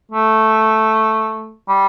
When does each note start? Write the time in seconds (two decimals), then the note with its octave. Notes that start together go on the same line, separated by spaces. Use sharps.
0.12 A3
1.68 G3